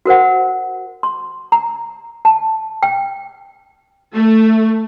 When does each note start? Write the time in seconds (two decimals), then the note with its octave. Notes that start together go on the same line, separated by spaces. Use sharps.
0.06 F#4 A#4 C5 F#5
1.03 C6
1.52 A#5
2.25 A5
2.83 G5
4.14 A3